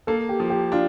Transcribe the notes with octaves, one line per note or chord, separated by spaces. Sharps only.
A#3 A4
G4
F3
G4
D4 F4